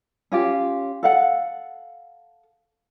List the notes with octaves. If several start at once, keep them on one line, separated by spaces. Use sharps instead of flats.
C#4 F4 G4
A4 F5 F#5